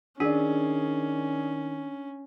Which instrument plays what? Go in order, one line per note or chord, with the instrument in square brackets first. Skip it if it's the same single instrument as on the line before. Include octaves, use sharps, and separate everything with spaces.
[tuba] D#3 [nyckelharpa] C#4 [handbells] D4 [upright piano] G#4 D5